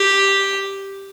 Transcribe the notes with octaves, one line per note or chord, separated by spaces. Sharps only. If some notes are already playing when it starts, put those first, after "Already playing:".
Already playing: G4